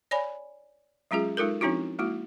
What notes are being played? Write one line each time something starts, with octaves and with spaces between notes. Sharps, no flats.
C#5 D5 G#5 B5
F#3 G#3 C#4 F4 G#4
G#3 D#4 F4 A4 A#4
F3 C4 C#4 D#4 E4 F#4
G#3 A#3 E4 F#4